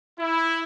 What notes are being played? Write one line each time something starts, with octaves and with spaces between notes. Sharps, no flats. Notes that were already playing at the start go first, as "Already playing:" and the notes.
E4